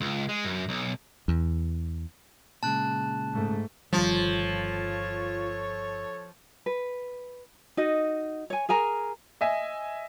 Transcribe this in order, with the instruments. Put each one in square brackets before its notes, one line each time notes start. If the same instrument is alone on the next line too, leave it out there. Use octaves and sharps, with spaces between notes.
[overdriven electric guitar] C#2
G#3
F#2
B1
[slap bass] E2
[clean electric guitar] A#2 C#3 G#3 [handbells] A5 F#6
[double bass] G#2 A3
[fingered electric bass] G1 D#3 G3 [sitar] F3 [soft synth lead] F4 [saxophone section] A4 C#5
[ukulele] B4
D#4 F#4 D#5
C#5 G#5
G#4 A#4 G#5 A#5
[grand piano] D#5 E5 G#5